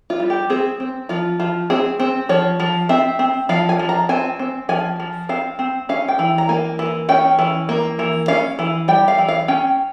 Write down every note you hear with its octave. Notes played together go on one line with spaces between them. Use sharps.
F4
G3
G4
C4 G#4
C4
F3 F4
F3 F4
C4 G#4
C4
F3 C#5
F3
C4 E5
C4
F3 F5
G#5
F3
A#5
C4 G#5
C4
F3 G#5
F3
C4 F5
C4
C#4 F5
G5
E3
A#5
A#3 G#5
E3
C#4 G5
E3
A#3
E3
C#4 F5
E3
G3 G5
F5
E3
F5
C#4 G5